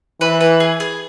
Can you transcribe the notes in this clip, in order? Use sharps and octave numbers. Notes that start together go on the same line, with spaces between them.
E3 B4
B4
G#4
G#4